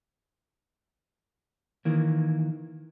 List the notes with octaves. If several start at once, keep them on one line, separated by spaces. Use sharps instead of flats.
D#3 E3 A#3